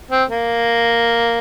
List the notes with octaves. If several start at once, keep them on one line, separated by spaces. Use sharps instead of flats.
C4
A#3